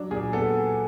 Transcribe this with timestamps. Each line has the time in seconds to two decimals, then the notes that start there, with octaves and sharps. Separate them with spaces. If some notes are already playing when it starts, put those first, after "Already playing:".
Already playing: F#3 D4
0.11 A#2 G#4
0.33 B3 A4